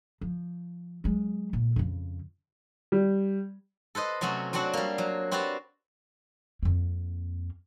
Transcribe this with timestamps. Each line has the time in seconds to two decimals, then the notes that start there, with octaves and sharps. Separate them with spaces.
0.21 F3
1.04 F#3 G#3
1.53 A#2
1.76 F2 C#3
2.92 G3
3.95 A4 B4 C5 D#5
4.21 C3 F#3 A3 C#4 F#4
4.53 F#3 C4 D4 F#4 F#5
4.73 G3 A#3
4.98 F#3
5.31 C4 F#4 G4 B4 D5 C6
6.63 F2 A#3